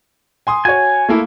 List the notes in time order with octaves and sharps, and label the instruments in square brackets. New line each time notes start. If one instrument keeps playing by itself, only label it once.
[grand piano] G#5 C6 D#6
[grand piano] F#4 C#5 [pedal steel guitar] G#5
[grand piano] A3 A#3 E4